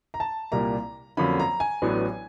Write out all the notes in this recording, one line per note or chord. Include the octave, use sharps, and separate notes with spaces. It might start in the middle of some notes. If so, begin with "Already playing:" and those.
A#5
A5
C2 A#2 G3 A#3 A#5
F2 D3 F#3 A#3 C#4 B5
A#5
G#5
A1 A2 F#3 B3 D4